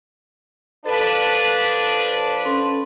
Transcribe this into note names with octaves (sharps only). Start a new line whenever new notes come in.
F3 D4 A4 B4 A5
C#4 A4 C6